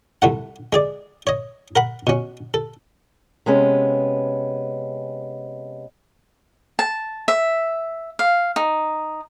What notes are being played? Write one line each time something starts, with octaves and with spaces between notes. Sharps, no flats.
C2 A3 F#5
G#3 G#4 D5
C#5 D#5
A#4 F#5 B5
B2 C#4
A4
C3 G#3 B3 C#4
A5
E5
F5
D#4